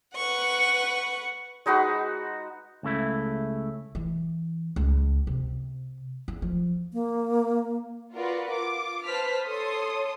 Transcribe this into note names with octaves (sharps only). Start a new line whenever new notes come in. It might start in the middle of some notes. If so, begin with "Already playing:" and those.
B4 F#5 C#6
G#3 D#4 F#4 B4
C#2 C#3 A3 E4
E3
C#2
C3
E2
F3
A#3
F4 F#4 A#4 B4 D5
F4 D6
B4 C5 A5 F6 B6
A4 C#5 C6 D#6